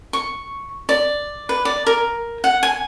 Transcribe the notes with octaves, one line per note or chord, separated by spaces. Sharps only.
C#6
D5
B4
D5
A#4
F#5
G#5